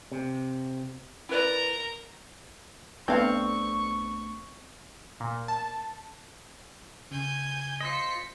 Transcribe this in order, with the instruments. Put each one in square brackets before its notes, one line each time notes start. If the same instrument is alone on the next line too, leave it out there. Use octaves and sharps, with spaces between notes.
[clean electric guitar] C3
[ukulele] E4 B4 D5 [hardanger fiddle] A#4 A#5
[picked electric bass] B1 A3 D4 [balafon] B3 B4 [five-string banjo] C4 F5 [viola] C#6
[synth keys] A#2
A5
[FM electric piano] C#3 [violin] G#5 G6
[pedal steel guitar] F4 C5 D#5 [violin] B6 C#7